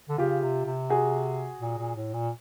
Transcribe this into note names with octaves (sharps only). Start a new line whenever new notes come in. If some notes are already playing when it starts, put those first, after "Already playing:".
D3
C#3 F4 G4
C3
C3
F#4 G#4
A#2
A#2
A2
A#2